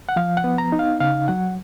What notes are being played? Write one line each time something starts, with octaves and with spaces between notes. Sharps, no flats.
F#5
F3 F5
F#5
B3
A#5
D#4
F5
C#3 F5
F#3 F#5